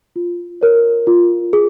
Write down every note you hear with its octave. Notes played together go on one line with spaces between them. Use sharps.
F4
A#4 C#5
F4
G#4